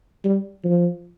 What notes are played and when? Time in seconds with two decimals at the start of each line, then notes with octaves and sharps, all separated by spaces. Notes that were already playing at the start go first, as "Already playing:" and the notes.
0.24 G3
0.64 F3